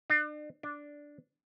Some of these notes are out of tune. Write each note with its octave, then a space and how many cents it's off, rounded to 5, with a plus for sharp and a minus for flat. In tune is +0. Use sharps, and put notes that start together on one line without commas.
D4 +40
D4 -5